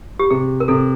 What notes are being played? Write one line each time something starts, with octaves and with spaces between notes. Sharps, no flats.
G4
C3 G#4
A#4
C3 A4